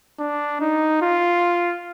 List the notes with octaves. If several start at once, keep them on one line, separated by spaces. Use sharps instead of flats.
D4
D#4
F4